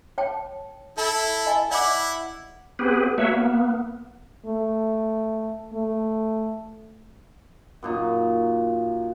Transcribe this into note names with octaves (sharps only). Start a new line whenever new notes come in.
C#5 G5 A5
E4 A4 A5
D#5 G#5
E4 D5 F#5 D6
B3 C4 G4 G#4 B4
A3 A#3 F#4 B4 C#5 E5
A#3 B3
A3
A3
F#2 A#2 D#4